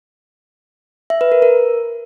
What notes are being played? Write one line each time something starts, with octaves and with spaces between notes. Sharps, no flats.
E5
B4
A#4
A#4